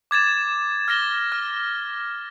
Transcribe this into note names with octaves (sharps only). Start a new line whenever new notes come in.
D6 G#6 A6 E7
F6 A6 A#6 G7
F6